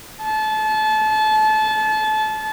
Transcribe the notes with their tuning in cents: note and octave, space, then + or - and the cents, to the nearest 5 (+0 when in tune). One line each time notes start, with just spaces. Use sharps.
A5 -30